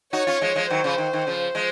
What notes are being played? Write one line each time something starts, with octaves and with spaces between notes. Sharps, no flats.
D#4 F#4 C#5
C#4 F4
F3 G#3
F3 G#3
D#3 F#3 C5
C#3 F3
D#3
D#3
C#3 F3
F3 G#3